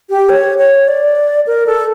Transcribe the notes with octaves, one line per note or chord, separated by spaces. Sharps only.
G4
C#5
C#5
D5
A#4
A4